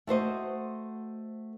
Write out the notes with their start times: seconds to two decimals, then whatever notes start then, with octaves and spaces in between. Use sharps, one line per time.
0.07 A3 F#4 C5 D#5